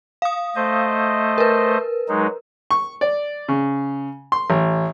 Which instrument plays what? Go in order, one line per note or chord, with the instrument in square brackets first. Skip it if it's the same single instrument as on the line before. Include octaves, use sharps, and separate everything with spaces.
[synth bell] F5 D#6
[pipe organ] A3 C5 D#5
[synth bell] A#4 B4
[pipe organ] F#3 G#3 D#4
[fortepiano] C#6
D5
C#3
C6
A1